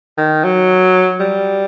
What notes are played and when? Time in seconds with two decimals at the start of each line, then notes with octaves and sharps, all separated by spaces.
0.18 D#3
0.44 F#3
1.20 G3